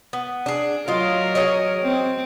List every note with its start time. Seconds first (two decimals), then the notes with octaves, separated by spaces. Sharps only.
0.13 B3
0.46 D4 G#4
0.88 F#3 F4 A#4 D#5
1.35 G#4 C#5 D#5
1.82 C4